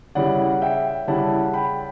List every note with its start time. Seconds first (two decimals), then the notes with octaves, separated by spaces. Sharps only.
0.15 C#3 G3 C#4 E4 D5 F#5
0.62 E5 G5
1.07 C#3 G3 C#4 E4 F#5 A5
1.54 G5 B5